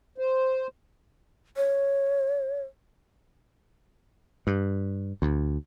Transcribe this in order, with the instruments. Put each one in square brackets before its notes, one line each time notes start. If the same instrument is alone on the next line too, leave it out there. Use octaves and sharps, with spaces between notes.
[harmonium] C5
[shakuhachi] C#5
[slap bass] G2
D2